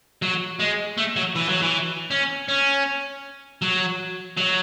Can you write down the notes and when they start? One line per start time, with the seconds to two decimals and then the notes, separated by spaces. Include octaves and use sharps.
0.22 F#3
0.60 G#3
0.98 A3
1.16 F#3
1.36 E3
1.49 F#3
1.62 E3
2.11 C#4
2.49 C#4
3.62 F#3
4.37 F#3